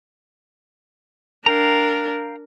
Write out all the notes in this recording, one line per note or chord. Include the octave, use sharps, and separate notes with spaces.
D4 A#4 F5 G5 A#5